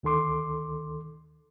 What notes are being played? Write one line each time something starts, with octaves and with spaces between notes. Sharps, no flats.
D2 D#3 A4 C6 D6